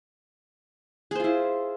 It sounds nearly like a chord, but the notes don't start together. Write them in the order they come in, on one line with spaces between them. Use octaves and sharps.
G#4 C5 F4 E4